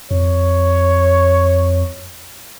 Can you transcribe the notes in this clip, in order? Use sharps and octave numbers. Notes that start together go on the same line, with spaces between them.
F2 C#5